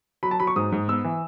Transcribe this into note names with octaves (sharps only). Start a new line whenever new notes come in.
F#3 B5
A5
F#3 B5
C#6
G#2 D#6
G#2
B3 E6
E3